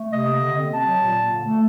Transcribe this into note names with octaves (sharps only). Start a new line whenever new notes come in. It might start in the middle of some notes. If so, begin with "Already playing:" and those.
Already playing: A3
C3 D#5
A#3
D3
C4
C3 A5
F#3
A#2
A#3
D3
A3